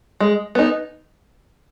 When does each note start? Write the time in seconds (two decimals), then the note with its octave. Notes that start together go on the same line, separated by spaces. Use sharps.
0.20 G#3
0.55 B3 D#4